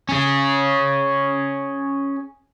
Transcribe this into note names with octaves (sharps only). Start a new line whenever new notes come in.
C#4 G#4